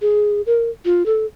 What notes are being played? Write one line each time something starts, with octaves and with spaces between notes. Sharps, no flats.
G#4
A#4
F4
A4